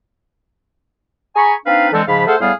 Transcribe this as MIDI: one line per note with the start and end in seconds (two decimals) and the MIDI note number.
1.36 1.54 68
1.36 1.54 80
1.36 1.54 82
1.36 1.54 83
1.36 1.54 85
1.66 1.90 60
1.66 1.90 62
1.66 1.90 63
1.66 1.90 71
1.66 1.90 77
1.92 2.02 50
1.92 2.02 52
1.92 2.02 56
1.92 2.02 60
1.92 2.02 69
2.07 2.23 44
2.07 2.23 49
2.07 2.23 53
2.07 2.23 77
2.07 2.23 83
2.27 2.35 57
2.27 2.35 68
2.27 2.35 69
2.27 2.35 72
2.27 2.35 77
2.27 2.35 78
2.40 2.52 45
2.40 2.52 55
2.40 2.52 59
2.40 2.52 68
2.40 2.52 77